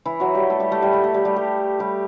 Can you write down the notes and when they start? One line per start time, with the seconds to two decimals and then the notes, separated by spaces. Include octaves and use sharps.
0.05 E3 E4
0.20 F#3 F#4
0.35 G3 G4
0.50 A3 A4
0.60 G3 G4
0.71 A3 A4
0.82 G3 G4
0.93 A3 A4
1.04 A3 A4
1.14 G3 G4
1.25 G3 G4
1.36 G3 G4
1.79 G3 G4